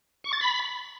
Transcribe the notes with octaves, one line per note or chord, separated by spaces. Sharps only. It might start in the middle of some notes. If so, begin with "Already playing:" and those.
C#6
A6
B5